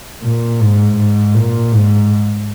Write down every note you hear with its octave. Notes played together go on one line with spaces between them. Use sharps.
A#2
G#2
G#2
A#2
G#2